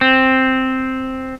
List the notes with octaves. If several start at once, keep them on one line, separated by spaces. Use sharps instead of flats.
C4